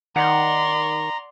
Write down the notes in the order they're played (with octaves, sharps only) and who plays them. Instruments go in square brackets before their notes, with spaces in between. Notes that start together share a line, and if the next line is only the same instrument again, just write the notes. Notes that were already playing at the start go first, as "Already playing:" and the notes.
[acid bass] D#3 [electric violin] D5 C6 [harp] F#5 [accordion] A#5